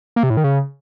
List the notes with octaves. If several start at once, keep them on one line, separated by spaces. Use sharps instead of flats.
A#3
C3
A2
D#3
C#3